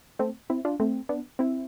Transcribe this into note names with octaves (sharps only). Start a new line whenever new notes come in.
A3 C4
C4 E4
D4 F4
A3 C4
B3 D4
C4 E4